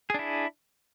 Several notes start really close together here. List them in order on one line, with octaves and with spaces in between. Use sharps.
G#4 D4 E4